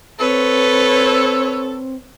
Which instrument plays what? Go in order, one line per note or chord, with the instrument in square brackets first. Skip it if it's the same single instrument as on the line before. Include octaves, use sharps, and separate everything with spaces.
[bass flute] C4 [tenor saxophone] A4 [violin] B4 C#5